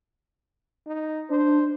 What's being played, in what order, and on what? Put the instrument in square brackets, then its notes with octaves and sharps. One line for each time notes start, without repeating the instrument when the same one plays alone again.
[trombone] D#4
[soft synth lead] D4 [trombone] C5